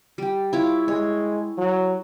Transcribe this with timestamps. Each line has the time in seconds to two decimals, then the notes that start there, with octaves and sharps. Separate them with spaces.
0.18 G3 G4
0.53 E4 F4 C#5 D6
0.88 G#3 C#5
1.58 F#3